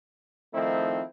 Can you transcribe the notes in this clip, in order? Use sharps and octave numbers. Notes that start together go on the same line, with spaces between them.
D#3 F3 A3 C4 D#4 E4